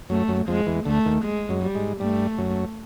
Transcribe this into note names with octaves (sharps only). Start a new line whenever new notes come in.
F#2 F#3 A3
F#2 F#3
F2 F3 G#3
E2 E3
D2 D3 A3
D#2 D#3
G#3
F#2 F#3
G3
G#2 G#3
G2 G3 A3
F#2 F#3